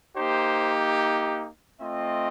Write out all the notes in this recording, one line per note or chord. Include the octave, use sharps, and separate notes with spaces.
A#3 D#4 G4 C5
A3 C4 F4 D#5